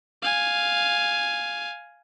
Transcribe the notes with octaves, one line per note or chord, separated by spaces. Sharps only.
F5 G#5